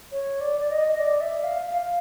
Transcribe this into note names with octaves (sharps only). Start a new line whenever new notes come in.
C#5
D5
D5
D#5
D#5
D5
E5
F5
F5